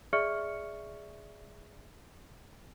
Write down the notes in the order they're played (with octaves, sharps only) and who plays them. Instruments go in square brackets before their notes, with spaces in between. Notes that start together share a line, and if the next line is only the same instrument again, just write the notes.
[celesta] G#4 D5 E5 C#6 F6 C#7